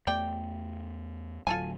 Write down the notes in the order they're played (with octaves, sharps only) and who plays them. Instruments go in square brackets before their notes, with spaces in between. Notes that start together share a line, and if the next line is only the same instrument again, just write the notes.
[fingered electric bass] E2 A3 [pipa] G4 D5 G5
[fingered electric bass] D1 D2 F#3 [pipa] F4 A4 G#5